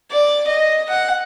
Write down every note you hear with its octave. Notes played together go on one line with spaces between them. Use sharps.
D5
D#5
F#5